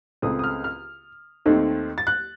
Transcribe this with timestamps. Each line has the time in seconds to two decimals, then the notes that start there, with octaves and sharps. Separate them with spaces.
0.22 C#2 C#3 A3 C4 D#6
0.39 D#6
0.44 F6
0.64 F6
1.46 D#2 D#3 A3 C4
1.98 A6
2.07 F#6